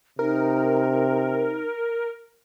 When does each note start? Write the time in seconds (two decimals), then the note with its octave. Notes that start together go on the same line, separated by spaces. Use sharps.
0.19 C3 D#4 A#4